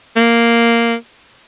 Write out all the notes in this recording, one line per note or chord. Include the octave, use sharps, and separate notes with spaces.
A#3